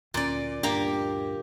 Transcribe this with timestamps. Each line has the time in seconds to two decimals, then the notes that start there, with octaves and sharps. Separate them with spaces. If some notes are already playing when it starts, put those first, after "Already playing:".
0.14 D2 A#2 C#4 D5
0.63 D2 G2 A#3 D4 G4